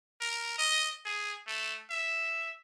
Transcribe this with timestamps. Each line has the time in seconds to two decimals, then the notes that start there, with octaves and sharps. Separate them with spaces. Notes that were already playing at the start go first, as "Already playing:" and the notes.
0.21 A#4
0.58 D#5
1.05 G#4
1.47 A3
1.90 E5